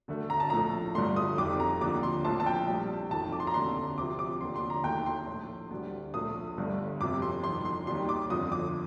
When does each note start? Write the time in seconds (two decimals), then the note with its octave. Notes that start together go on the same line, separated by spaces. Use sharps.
0.08 D2 D3 A3
0.30 A#5
0.40 A5
0.50 A#1 A2 F3 A3 A#5
0.95 G1 G2 D3 F3 A3 C6
1.16 D#6
1.38 F1 F2 D#3 G3 D6
1.60 A#5
1.81 D#2 D3 F3 D6
2.03 C6
2.25 A#1 A2 F3 A5
2.40 A5
2.46 G5
2.68 A#1 A2 G3
3.11 F1 F2 D#3 A5
3.32 D6
3.40 C6
3.47 A#5
3.54 F1 D#2 D3 A3 C6
3.98 D2 C3 F3 D6
4.19 D6
4.41 D#2 D3 F3 C6
4.56 C6
4.70 A#5
4.84 D#2 D#3 A3 G5
5.06 C6
5.27 A#1 A2 A3
5.71 D2 D3 G3
6.14 A#1 A#2 A3 D#6
6.58 G1 G2 D3 A3
7.00 G1 F2 C3 D6
7.22 C6
7.44 G1 F2 D#3 C6
7.65 C6
7.87 D#2 D#3 G3 C6
8.09 D6
8.30 G1 F2 D3 F3 D#6
8.52 D6